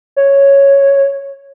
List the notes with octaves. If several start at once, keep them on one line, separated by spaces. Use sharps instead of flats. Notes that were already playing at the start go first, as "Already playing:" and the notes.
C#5